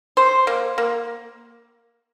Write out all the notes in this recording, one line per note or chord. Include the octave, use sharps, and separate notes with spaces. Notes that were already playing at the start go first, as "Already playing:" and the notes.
C5
A#3
A#3